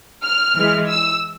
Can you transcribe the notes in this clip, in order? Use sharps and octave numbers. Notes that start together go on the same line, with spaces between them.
F6
E3 G#3
E6